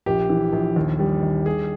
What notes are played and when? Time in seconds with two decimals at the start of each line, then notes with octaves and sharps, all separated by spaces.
0.06 A#1 G4
0.29 E3
0.53 A#1
0.76 D#2
0.99 G3
1.23 D#2
1.46 G3 G#4